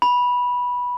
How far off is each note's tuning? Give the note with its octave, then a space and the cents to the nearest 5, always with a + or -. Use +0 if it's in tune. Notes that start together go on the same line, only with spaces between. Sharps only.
B5 -10